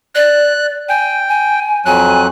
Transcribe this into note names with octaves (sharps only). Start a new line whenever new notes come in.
D5 F#6
G5 G#5
G#5
F2 F#3 G#5 F#6